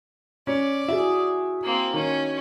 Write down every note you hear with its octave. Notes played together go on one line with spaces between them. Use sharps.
C#4 D5
E4 F#4 G#4 E5
A#3 C4
D#3 C#4